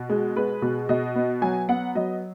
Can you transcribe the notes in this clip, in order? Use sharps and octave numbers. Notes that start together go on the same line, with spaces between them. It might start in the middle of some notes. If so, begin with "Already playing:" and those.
Already playing: B2
G#3
G#3 B4
B2
B2 D#5
B3
F#3 G#5
B3 F#5
F#3 D#5